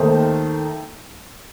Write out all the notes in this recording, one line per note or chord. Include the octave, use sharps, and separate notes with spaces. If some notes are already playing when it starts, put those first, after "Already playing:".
Already playing: D#2 D#3 A3 D#4 C5